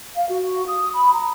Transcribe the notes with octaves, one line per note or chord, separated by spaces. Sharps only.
F5
F#4
D#6
B5
A#5